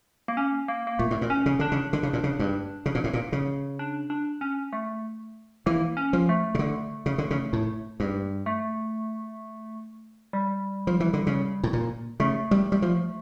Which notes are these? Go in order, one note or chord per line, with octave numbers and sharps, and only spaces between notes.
A#3
C#4
A#3
A#3
A#2 A3
A2
A#2
C#4
C#3
D3 D4
C#3
D3
C#3
A#2
C#3
G2
C#3
A#2
A2
A#2
C#3
D4
D4
C#4
A3
E3 A#3
C#4
F3
A3
C#3
D3
C#3
D3
C#3
A2
G2
A3
G3
F3
E3
D3
C#3
A2
A#2
C#3 A3
G3
G3
F3